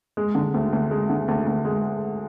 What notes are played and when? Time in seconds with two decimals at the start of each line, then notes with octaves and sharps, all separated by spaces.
0.17 G#3
0.35 D3
0.54 D2
0.73 D2
0.91 G#3
1.10 D3
1.28 D2
1.47 D2
1.65 G#3